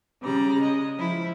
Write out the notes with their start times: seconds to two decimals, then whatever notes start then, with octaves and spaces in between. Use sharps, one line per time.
0.21 C#3 G3 D5 A#5
0.60 G#3 D#5
0.97 F3 E4